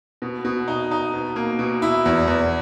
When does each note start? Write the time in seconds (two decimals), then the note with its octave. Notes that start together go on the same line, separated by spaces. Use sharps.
0.22 B2
0.45 B2
0.68 D#4
0.91 D#4
1.13 B2
1.36 A#3
1.59 B2
1.82 E4
2.05 E2
2.28 E2